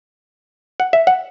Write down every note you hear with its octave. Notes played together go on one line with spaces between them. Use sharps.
F#5
E5
F#5